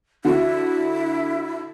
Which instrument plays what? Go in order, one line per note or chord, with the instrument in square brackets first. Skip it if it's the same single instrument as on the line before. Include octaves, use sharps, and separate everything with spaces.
[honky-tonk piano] D3 F#4 [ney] E4